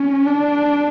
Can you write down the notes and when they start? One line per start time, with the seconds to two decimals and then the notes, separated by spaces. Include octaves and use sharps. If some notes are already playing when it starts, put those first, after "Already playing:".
Already playing: C#4
0.26 D4